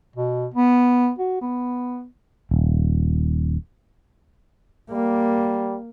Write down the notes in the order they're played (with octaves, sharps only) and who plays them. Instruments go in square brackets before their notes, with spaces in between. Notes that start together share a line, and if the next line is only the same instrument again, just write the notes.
[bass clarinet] B2
B3
F#4
B3
[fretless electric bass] D#1
[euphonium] G3 [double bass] A#3